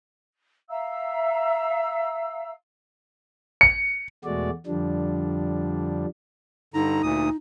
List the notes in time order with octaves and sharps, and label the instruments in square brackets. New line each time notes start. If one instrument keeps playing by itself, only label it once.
[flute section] E5 F5 A#5 E6
[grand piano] C#7
[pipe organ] E2 B2 G#3 A3 F#4 D5
F2 D3 F3 G3 D4
[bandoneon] G2 D3 A#5 [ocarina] D#4
[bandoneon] D2 A#2 D#6